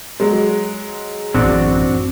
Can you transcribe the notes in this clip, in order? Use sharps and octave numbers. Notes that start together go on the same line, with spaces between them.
F#3 G#3
A1 F#2 C4 D4 F#4